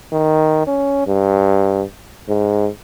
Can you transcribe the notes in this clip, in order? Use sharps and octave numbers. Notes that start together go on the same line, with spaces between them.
D#3
C#4
G2
G#2